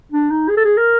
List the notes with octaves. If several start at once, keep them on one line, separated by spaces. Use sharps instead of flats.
D4
D#4
G#4
A4
G#4
A#4